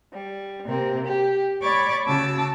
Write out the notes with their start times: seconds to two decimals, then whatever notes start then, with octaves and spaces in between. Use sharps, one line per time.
0.13 G3
0.66 C3 A#3 C4
1.06 G4
1.62 C#5 D5 B5 C#6 D6 A6
2.06 C#3 F#4 A5 D6 E6